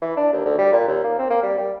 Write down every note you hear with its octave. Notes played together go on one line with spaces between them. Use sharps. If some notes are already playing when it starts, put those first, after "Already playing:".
E3
D4
D#2
D2
G3
A#2
D#2
A#3
C4
A#3
G3
G3